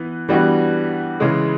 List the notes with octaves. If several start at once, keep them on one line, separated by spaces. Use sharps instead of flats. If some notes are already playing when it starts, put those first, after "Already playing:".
Already playing: E3 B3
E3 G3 B3 D4 F#4
C#3 E3 G#3